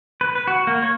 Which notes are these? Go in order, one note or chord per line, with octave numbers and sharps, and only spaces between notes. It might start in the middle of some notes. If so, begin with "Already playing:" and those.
B4
B4
F#4
A#3
C#5